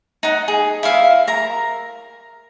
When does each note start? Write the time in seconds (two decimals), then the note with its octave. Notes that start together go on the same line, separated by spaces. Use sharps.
0.23 D#4 F#5
0.48 G#4
0.83 E4 E5 F5
1.27 A#4 A#5